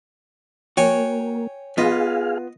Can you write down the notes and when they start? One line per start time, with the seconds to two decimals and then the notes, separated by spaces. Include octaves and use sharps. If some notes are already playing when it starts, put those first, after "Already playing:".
0.77 A#3 F#4 C#5 G5 G#5
1.78 B3 F4 G#4 D#5 F5